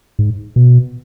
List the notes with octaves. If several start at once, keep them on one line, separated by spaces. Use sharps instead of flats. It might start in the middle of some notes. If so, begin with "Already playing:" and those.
G#2
B2